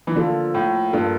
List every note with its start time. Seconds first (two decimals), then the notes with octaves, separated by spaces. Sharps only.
0.07 E3
0.15 D3 F3 A#3 F4 A4
0.54 A2
0.93 G2 F3 A#3 F4 A4